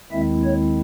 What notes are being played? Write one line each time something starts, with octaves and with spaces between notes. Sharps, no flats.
D#2 D#3 G#3 C4 E4 E5
C#5